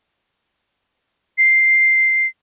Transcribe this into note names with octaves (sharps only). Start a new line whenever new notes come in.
C7